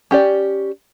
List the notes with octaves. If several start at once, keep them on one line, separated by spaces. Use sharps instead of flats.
C#4 G4 D5